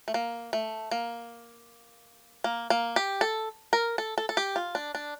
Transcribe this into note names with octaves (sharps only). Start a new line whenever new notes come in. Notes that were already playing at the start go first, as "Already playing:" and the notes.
A3
A#3
A3
A#3
A#3
A#3
G4
A4
A#4
A4
A4
A4
G4
F4
D4
D4